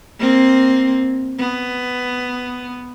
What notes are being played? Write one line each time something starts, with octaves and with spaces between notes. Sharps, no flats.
A#3 C4
B3